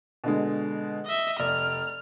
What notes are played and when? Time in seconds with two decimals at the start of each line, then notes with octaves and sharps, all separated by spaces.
0.24 B2 D3 G#3
1.06 D#5 E5
1.40 F1 D5 F6